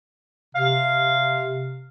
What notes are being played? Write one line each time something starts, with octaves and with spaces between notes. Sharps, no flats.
C3 F5